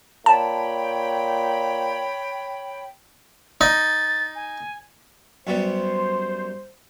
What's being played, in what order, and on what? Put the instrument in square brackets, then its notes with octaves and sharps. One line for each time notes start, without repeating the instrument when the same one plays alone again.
[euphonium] A#2 [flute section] C#5 G5 B5 [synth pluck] A5
[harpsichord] D#4 [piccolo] A6
[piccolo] G#5
[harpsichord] F#2 G3 B3 [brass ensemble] C5